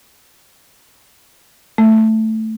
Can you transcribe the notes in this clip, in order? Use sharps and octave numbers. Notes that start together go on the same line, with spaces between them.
A3